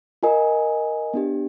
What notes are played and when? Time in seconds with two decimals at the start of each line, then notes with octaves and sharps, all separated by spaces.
0.23 F4 A#4 D#5 G#5
1.14 B3 D4 G4